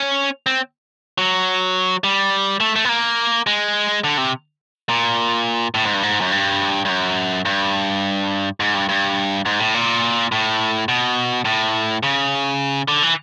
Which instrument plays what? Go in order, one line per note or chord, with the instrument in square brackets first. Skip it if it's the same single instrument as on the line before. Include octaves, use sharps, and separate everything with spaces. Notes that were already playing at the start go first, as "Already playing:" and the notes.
Already playing: [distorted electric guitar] C#4
C4
F#3
G3
A3
A3
B3
A#3
G#3
D3
C3
A#2
A2
G#2
G2
G#2
F#2
G2
G2
F#2
G2
G#2
G2
G2
G#2
A2
A#2
A2
B2
A2
C#3
D3
E3